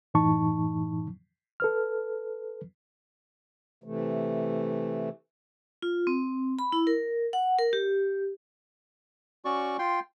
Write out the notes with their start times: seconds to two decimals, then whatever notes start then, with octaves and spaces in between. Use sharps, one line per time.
0.14 F#2 A2 E3 D#4 A5 C#6
1.60 A4 B4 F6
3.84 C3 E3 A3
5.82 F4
6.07 C4
6.59 B5
6.72 E4
6.87 A#4
7.33 F#5
7.59 A#4
7.73 G4
9.45 C#4 F#4 D5 C#6
9.79 F4 G5 C6